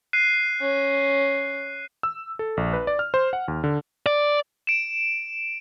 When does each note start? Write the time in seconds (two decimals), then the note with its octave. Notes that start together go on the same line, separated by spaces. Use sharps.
0.13 F#6 C7 D#7
0.61 C#4
2.03 E6
2.39 A4
2.57 A#1
2.73 B4
2.87 D5
2.99 F6
3.14 C5
3.33 F#5
3.48 D#2
3.64 D3
4.06 D5
4.67 D7 E7